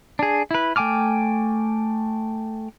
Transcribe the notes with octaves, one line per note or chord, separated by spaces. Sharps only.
D4 G#4
E4 B4
A3 G5 G#5 D6 F6